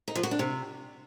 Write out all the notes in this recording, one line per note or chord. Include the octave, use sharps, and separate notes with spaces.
D#4
F3
F#4
D4
C3